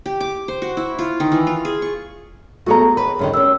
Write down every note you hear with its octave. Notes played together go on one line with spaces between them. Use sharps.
G4
D6
C5
F#4
E4
F4
D#3
E3
F4
G#4
C#6
A3 B3 F#4 G#4 A4 A#5
D#2 B4
F#2 D3 D#3
D#2 C#4 E6